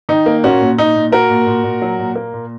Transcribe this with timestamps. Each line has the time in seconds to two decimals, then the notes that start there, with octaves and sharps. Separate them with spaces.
0.09 D#3 D#4
0.26 A#3
0.44 A#2 C#4 F#4
0.61 A#2
0.77 A#2 D#4
0.96 A#2
1.12 A#3 F#4 A#4
1.30 A#2
1.47 A#2
1.64 A#2
1.82 F#3
1.99 A#2
2.15 A#3
2.33 A#2